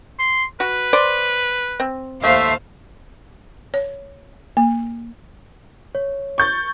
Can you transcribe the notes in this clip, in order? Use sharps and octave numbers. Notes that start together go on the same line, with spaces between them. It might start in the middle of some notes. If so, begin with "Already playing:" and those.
C6
F#4 B4
C5 D5 C6
C4
D#2 A3 C5 E5 F5
C#5
A#3
C#5
C#6 G6 A6